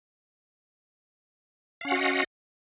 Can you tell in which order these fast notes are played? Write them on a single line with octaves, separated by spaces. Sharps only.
F5 C#4 F#5 F#4 D#5